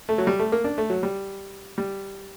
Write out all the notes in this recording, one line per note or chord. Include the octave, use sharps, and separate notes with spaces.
A3
F#3
G3
A3
A#3
D4
A3
F#3
G3
G3